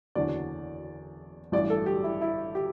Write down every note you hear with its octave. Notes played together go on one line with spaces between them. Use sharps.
F#1 E2 D3 F#3 D5
A1 G2 E3 D5
A4
G4
E4
E4
G4